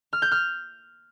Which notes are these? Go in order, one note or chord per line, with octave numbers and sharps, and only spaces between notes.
F6
G6
F6